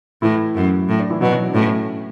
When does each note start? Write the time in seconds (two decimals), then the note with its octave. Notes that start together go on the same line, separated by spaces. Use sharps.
0.22 A2 E3 E4
0.55 F#2
0.88 A2
0.99 D4
1.10 E3 E4
1.21 B2 F#3 F#4
1.33 F#3 F#4
1.49 D4
1.54 A2 C#4